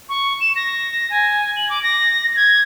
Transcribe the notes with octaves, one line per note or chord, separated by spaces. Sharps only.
C#6
E7
A#6
G#5
F#7
D6
A#6
G#6